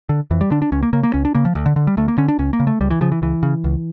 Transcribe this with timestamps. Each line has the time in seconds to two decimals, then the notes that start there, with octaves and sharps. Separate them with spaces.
0.09 D3
0.31 F2 E3
0.41 G3
0.51 D3 D4
0.62 D4
0.72 C#2 C#4
0.83 A#3
0.93 C#3 A#3
1.03 A#3
1.14 C#2 C#4
1.25 D4
1.35 C#3 A#3
1.45 F3
1.55 D2
1.66 D3
1.76 D3
1.87 G3
1.97 D2 A3
2.08 A#3
2.18 D3 C#4
2.28 D4
2.39 C#2 C#4
2.53 A#3
2.60 C#3
2.67 A3
2.81 C#2 G3
2.90 E3
3.01 C#3 F3
3.12 E3
3.22 C#2 E3
3.43 C#3
3.64 C#2